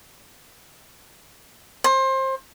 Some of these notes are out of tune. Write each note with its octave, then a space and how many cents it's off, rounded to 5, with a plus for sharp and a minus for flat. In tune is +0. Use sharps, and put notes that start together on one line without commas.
C5 +25